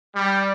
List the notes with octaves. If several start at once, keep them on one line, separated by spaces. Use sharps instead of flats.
G3